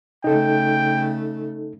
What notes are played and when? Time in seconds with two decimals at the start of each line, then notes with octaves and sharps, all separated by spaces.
0.24 C#3 A3 D#4 A4 G5